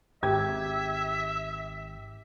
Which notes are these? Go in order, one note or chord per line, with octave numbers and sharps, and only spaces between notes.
G#1 G4 E5 G#6